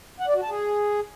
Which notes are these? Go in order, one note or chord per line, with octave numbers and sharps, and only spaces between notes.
F#5
D5
F#4
A5
G#4